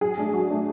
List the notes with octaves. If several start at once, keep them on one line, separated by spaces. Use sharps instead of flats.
F#3 G#4
A3 D4
F#3 F#4
A3 D4